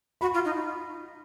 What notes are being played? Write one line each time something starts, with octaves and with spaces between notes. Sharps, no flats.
F#4 B5
F4
D#4